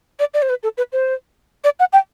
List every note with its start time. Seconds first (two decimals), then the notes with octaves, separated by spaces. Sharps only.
0.19 D5
0.34 D5
0.42 C5
0.49 B4
0.63 A4
0.78 B4
0.92 C5
1.64 D5
1.80 F#5
1.93 G5